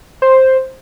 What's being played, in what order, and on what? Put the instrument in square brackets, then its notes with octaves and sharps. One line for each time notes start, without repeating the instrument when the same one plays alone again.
[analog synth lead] C5